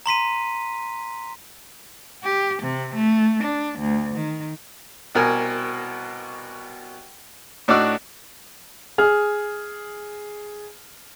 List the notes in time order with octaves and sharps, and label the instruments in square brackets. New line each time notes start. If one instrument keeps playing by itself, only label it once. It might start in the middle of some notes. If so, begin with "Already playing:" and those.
[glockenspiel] A#5 C6 B6 D#7
[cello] G4
C3
A3
D4
D2
D#3
[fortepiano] C2 B2 A#4 G#5
A2 D4 D#4 F#4 D6 E6
[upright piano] G#4 F6